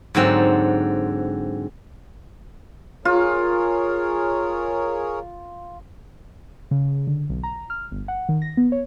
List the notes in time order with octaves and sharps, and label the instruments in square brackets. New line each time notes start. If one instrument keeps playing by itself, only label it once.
[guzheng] G#2 D3 F#3 C4
[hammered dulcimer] F4 [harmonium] G#4 A#4 C#5
[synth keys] C#3
D3
B1
A#5
F6
G1
F#5
D#3
A#6
B3
C#5